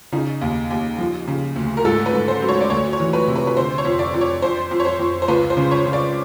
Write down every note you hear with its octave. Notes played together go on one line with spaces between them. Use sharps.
C#3 D#4
D#2
D#2
F3
C#3
D2
A#4
G#2 A4
B4
G#2
C5
F#3
C#5
D5
D2 C#5
C#5
E3
B4
C3
B4
B4
D3 C5
C#5
F2
D5
F2
C#5
F2 C5
F2
C#5
C5
F2
C5
C#2 B4
C5
C#3
C#5
C#3
D5